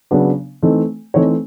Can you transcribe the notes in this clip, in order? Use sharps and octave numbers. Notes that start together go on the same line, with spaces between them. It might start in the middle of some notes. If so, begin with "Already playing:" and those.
C#3 F#3 B3 D4
E3 A3 C4 D#4
E3 A3 C4 D#4 C#5